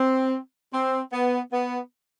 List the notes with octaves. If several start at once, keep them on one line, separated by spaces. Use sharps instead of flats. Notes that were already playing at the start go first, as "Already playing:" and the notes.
Already playing: C4
C4
B3
B3